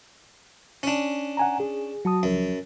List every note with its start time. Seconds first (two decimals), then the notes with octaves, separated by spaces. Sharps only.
0.83 C#4 D4
1.37 F#5 G#5 A#5
1.60 G#4
2.05 F#3 F#4 A5 D#6
2.23 C#2 F#2 F3